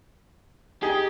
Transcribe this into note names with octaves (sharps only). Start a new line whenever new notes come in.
D#4 G4 G#4